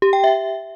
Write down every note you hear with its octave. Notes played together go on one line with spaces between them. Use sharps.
G4
G5
E5